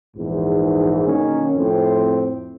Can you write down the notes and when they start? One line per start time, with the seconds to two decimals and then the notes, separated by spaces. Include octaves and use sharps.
0.16 A#1 E2 G#2
1.06 B1 D#3 A#3 C#4
1.56 F2 A2 C4